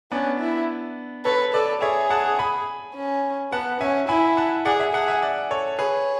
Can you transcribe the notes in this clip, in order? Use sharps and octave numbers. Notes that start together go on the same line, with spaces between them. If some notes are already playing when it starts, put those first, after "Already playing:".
B3 C#4 D4
E4
A4 B4 C#5
A4 B4 D5
G#4 C#5 E5
F#5 A5
G#5 B5
C#4
B3 F#5 A5
C#4 E5 G#5
E4 G#5 B5
F#5 A5
G#4 D5 F#5
E5 G#5
G#4 F#5 A5
E5 G#5
D5 F#5
A4 C#5
G#4 B4 C#5